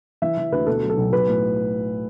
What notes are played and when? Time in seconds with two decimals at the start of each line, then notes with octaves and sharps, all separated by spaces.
0.22 E3 E5
0.37 E3
0.52 D2 B4
0.67 B2 A4
0.83 F#3
0.90 A4
0.97 B1
1.13 B1 B4
1.28 A2